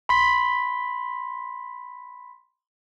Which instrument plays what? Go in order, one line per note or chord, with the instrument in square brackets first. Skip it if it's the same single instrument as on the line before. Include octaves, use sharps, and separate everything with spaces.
[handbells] B5 C6 B6